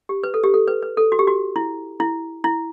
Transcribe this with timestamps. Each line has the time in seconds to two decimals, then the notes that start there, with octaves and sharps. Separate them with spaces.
0.09 G4
0.24 B4
0.34 A4
0.44 G4
0.54 A4
0.68 B4
0.82 B4
0.97 A4
1.12 F#4
1.19 G4
1.27 F#4
1.56 E4
2.00 E4
2.44 E4